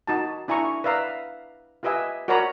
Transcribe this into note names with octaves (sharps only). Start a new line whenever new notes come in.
D#4 F#4 A5
D4 E4 G#5 A#5 C#6
B4 D5 E5 F5 A#5
F4 G4 B4 D#5 E5 G#5
F#4 A#4 C#5 D5 A#5 B5